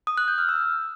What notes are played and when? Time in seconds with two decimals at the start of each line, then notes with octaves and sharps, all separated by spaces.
0.07 D#6
0.18 F#6
0.28 G6
0.38 F6
0.49 E6